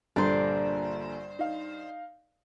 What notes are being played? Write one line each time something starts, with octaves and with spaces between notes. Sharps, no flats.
A#1 G2 D3 D4 C5 A#5
D#4 F5